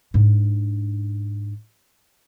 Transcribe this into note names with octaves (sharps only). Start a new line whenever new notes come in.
G#2 D4